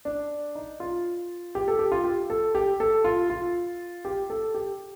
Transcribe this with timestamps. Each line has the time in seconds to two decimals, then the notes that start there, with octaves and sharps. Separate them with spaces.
0.05 D4
0.55 D#4
0.80 F4
1.55 G4
1.68 A4
1.79 G4
1.92 F4
2.04 G4
2.30 A4
2.55 G4
2.80 A4
3.04 F4
3.30 F4
4.05 G4
4.30 A4
4.55 G4